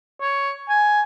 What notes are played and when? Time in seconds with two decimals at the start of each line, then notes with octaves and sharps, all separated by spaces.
0.21 C#5
0.69 G#5